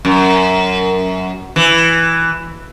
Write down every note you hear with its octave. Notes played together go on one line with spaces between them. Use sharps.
F#2
E3